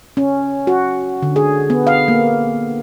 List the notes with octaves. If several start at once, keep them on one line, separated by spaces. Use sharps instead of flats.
C#4
F#4
D3
G#4
B3
F5
A#3